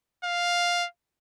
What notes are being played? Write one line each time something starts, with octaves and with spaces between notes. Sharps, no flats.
F5